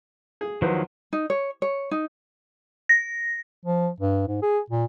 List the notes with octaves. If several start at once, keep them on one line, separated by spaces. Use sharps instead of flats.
G#4
E2 D#3 F3 F#3 B4 C5
D#4
C#5
C#5
D#4
A#6
F3
G2
G#2
G#4
A#2